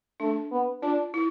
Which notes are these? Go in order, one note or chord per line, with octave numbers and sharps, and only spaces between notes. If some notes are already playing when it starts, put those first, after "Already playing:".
A3 D4
B3
D4 F4
E4